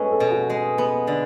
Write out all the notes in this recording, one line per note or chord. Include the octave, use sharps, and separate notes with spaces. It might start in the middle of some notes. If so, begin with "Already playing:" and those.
Already playing: G#3 C#4 A4 B4
A4
B2
F#4
G#3
B3
D3